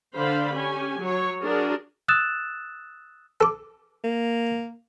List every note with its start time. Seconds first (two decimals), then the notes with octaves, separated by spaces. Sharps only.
0.15 D3 D4 C5 F5 B5
0.53 C#4 G4 G#5
1.00 F#3 C#5
1.43 D4 F#4 G#4 A#4
2.08 D#6 E6 F#6 A6 E7
3.41 A4 D6
4.04 A#3